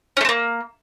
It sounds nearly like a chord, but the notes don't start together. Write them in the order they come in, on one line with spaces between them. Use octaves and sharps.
C#4 A3 C4 A#3